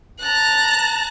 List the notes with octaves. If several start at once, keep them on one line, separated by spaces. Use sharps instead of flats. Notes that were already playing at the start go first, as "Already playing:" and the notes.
A5 A#5 F#6